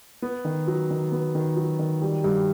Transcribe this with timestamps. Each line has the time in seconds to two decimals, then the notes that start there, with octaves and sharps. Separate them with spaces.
0.22 B3
0.45 D#3
0.67 F#3
0.90 D#3
1.12 B3
1.35 D#3
1.57 F#3
1.79 D#3
2.02 G3
2.24 G2